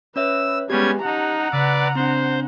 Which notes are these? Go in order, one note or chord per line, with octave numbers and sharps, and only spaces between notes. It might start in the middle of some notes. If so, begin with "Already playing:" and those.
C#4 B4 C#5 E5 E6
G3 G#3 B3 C#4 G4 G#6
C#4 D#4 F#5 A5 A#5 E6
C#3 B4 D5 E6
C4 D4 C5 B5